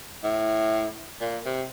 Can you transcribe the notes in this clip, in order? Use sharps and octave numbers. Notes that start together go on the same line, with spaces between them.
A2
A#2
C3